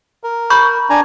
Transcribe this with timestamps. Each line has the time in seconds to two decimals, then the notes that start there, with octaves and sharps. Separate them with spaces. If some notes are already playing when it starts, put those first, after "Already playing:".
0.24 A#4
0.50 B5 C#6 G6
0.90 D4 G#5 A#5